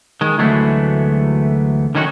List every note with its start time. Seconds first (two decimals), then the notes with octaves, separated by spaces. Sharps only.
0.21 D#3 G#3
0.38 D2 E3 F#3 G#3 A3 B3
1.95 D3 D#3 C#4 D#4 E4 F#4